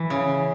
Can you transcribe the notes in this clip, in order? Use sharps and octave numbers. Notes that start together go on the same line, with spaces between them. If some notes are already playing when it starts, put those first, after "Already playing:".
Already playing: E3
C#3